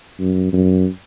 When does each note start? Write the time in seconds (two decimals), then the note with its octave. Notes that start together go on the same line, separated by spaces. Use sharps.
0.20 F#2
0.53 F#2